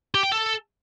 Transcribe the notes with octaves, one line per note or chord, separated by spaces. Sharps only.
G4
G5
A4